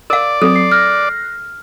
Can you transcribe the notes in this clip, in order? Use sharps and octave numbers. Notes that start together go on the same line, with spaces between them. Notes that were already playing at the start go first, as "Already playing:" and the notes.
A#4 D5 F5
F#3 C4 A4
C7
F6 F#6 A#6 C7